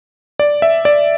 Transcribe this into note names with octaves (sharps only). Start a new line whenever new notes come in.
D5
E5
D5